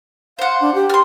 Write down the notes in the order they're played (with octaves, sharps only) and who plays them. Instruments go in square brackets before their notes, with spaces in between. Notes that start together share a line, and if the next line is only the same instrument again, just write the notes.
[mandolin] C5 F#5 [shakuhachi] F5
[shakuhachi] D4
G4
[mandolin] C6 F6